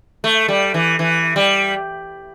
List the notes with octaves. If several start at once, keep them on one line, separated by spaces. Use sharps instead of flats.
A3
G3
E3
E3
G3